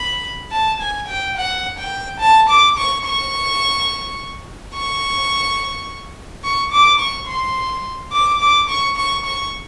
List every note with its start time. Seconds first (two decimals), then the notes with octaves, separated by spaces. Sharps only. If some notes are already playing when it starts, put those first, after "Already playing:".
Already playing: B5
0.52 A5
0.81 G#5
1.08 G5
1.37 F#5
1.79 G5
2.21 A5
2.49 D6
2.78 C#6
3.05 C#6
4.74 C#6
6.44 C#6
6.72 D6
7.00 C#6
7.28 C6
8.12 D6
8.41 D6
8.69 C#6
8.97 C#6
9.25 C#6